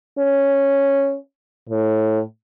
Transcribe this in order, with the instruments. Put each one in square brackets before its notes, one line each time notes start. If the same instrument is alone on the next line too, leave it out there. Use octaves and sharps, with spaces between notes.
[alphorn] C#4
A2